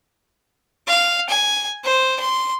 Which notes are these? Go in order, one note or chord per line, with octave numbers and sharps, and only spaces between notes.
F5
G#5
C5
C6